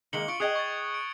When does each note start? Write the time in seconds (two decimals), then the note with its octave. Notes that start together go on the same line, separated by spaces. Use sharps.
0.13 D#3 G#3 A#3 C#7 F#7 G7
0.28 F4 C#6 C#7 D7
0.40 G#4 D#5 G5 D#6 F#6 G#6
0.56 C#6 G#6 A6
0.94 D7